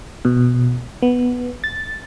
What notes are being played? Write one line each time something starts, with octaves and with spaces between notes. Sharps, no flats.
B2
B3
A6